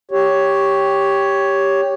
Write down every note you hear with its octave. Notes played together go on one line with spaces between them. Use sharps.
G4 C#5